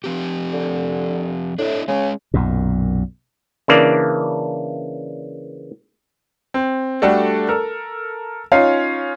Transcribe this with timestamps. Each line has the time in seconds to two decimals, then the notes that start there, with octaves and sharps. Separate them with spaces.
0.04 F3 C4 G4
0.53 D3
1.59 A2 D4 E4
1.88 C#3 G#3 A#3 C#4
2.34 B1 F#2 A#2
3.68 C#3 E3 A#3 D4 D5
6.54 C4
7.02 G3 A3 D4 F#4 A4
7.49 A4 A#4
8.52 C#4 D#4 F4 C#5 F5